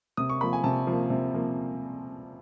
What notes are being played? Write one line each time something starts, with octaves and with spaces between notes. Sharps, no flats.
C3 D#6
C#6
F3 A#3 B5
G#5
C3 A5
F3
A#3
C3
F3 A#3